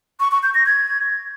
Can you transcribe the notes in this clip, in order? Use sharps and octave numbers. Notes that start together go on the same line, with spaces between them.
C#6
C#6
G6
A#6
G#6